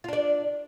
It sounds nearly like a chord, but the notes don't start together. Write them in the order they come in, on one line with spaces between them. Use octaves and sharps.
F4 D4 D5